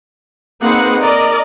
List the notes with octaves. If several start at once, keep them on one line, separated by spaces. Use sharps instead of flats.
A#3 C4 D#4 G#4 B4 F#5
A#4 D5 D#5